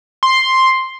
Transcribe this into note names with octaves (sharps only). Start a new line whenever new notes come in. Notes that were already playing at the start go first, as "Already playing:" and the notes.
C6